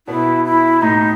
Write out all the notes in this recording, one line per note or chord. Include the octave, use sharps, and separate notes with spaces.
B2 B3 E4
E4
A2 A3 D#4